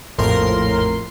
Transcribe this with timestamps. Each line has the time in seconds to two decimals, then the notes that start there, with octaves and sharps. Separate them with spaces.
0.18 A#1 F2 A2 F3 A#4 C6